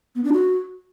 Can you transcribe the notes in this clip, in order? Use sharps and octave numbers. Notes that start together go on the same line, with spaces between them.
B3
D4
F#4